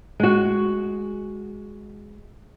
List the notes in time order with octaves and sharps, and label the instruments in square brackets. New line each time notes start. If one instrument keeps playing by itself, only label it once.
[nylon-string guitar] G#3 F#4